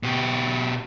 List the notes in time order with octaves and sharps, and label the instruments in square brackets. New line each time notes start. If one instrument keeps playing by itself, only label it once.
[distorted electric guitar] B2 G4